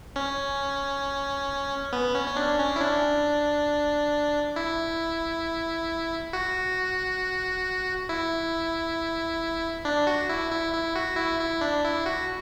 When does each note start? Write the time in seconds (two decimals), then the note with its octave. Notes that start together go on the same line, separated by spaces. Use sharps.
0.16 C#4
1.93 B3
2.15 C#4
2.26 C#4
2.36 D4
2.59 C#4
2.76 E4
2.81 D4
4.56 E4
6.33 F#4
8.09 E4
9.85 D4
10.07 F#4
10.29 E4
10.51 E4
10.73 E4
10.96 F#4
11.17 E4
11.40 E4
11.61 D4
11.84 E4
12.06 F#4